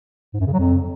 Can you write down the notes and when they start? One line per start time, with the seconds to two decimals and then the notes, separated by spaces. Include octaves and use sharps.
0.34 G#2
0.40 F#2
0.47 C#3
0.53 F#3
0.59 F2